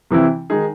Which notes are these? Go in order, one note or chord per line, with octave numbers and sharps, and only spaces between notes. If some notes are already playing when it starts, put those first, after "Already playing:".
C3 E3 C4 E4
D#3 G#3 D#4 G#4